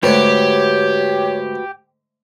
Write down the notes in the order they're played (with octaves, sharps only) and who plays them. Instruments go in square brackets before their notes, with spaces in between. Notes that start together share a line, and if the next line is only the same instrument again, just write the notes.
[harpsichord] G#2 D3 A3 [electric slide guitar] F#4 B4 [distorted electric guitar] G4 [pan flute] C#5